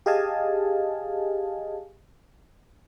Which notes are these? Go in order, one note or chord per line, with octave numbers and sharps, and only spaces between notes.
G4 G#4 D#5 F5 G#5 A5